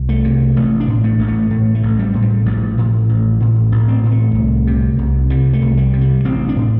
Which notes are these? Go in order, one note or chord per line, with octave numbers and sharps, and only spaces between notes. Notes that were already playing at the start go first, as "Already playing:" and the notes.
Already playing: C2
A3
C3
A1 A3
D4
A2
A3
A1
A3
A2 A3
A3
A1
G3
A2
G3
A1 F3
A2
A1
A2
A1
C4
A2
A3
C2
C3
C2
C3 G3
A3
C2
G3
C3
G3
A1 C4
D4
A2